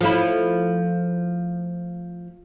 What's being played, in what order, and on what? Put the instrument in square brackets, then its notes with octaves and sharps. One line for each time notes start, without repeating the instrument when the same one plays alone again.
[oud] F3 A3 E4